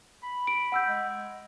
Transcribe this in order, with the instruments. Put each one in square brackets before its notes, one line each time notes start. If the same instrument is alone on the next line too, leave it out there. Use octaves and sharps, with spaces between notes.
[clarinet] B5
[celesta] D7
F#5 E6 G6
[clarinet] G#3